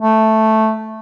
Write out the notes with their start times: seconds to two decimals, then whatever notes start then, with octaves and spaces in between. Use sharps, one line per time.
0.01 A3